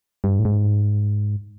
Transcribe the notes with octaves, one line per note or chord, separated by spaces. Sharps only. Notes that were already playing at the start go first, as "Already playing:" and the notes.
G2
A2
G#2